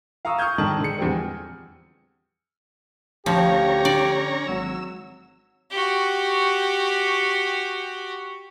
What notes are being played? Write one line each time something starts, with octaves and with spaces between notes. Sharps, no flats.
F5 A#5 C#6 D#6 E6
C#6 D#6 F6 G6 G#6
G#2 D3 D#3 D#5 A5 F#7
D3 G#3 C#7
E2 F3 G3 C4
G#5
D2 F3 C#4 G4 C#5 A#5
D3 D5
G#1 F#3 E6
F#4 G4